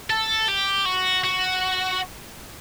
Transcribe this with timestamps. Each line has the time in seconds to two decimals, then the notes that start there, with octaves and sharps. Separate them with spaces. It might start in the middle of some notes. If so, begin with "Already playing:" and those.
0.10 A4
0.48 G4
0.85 F#4
1.24 F#4